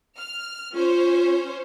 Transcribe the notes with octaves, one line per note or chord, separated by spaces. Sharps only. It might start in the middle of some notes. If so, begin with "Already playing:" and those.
F6
C#4 F4 C5 C#5